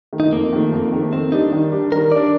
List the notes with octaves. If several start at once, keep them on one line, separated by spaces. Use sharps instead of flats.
D#3 A3
D#4
F2 A#3
D#3 A3
F2
D#3 A3
D#3 C4
G3 D4 D#4
D#3
G3 D4
D#3 A#4
G3 D4 D5